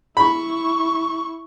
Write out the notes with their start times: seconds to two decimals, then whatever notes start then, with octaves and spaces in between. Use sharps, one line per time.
0.17 E4 B5 C#6